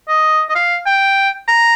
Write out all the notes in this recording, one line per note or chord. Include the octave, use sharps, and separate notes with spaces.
D#5
D#5
F5
G5
A#5